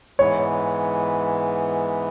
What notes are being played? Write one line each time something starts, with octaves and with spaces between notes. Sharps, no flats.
G#2 E3 B3 C#5